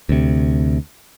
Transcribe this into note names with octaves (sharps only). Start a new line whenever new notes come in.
D2 C3